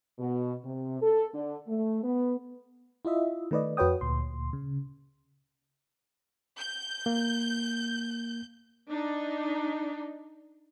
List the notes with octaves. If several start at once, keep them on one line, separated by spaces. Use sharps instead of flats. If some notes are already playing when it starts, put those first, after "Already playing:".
B2
C3
A4
D3
A3
B3
E4 F4 D#5 E5
D#3 A3 B4 D5 D#5
F2 F#4 B4 C#5 G5 D#6
D2 A#2 C6
C#3
G6
A#3
D4 D#4